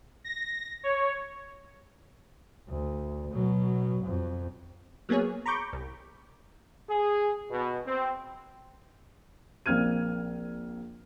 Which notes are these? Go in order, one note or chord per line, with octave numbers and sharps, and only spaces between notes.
A#6
C#5
D2
B2 F#3
F2
F#3 A#3 B3 G#4 C#5
A#5 B5 C#6 D6 G6
C2
G#4
B2
C4
A#1 A#3 C4 F6 G#6 D#7